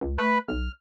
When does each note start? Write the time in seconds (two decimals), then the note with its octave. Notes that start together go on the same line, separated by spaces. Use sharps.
0.01 C#2
0.18 A3 B4 B5
0.48 B1 F6